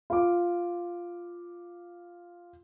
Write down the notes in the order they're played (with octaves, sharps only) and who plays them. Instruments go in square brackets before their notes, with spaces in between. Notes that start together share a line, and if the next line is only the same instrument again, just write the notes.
[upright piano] F4 D6